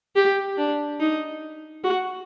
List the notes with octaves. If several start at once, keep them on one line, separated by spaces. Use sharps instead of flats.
G4
D4
D#4
F#4